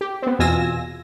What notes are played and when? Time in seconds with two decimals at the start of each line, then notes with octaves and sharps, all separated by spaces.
0.01 G4
0.22 B3 C4
0.39 E2 B2 F4 G#5 E6 A#6